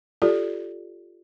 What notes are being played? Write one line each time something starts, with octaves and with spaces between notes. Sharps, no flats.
F4 G4 A4 D5